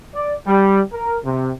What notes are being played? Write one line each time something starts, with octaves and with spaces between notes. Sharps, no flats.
D5
G3
A#4
C3